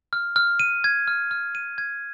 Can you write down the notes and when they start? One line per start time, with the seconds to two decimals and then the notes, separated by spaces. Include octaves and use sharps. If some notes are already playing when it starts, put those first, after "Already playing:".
0.13 F6
0.36 F6
0.60 D#7
0.84 G#6
1.08 F6
1.31 F6
1.55 D#7
1.78 G#6